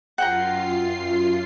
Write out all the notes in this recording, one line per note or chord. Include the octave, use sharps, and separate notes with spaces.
F#2 F4 F#5 G5 A#5 C7